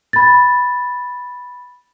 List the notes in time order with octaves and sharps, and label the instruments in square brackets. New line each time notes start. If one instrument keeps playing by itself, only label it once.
[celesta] B5 A6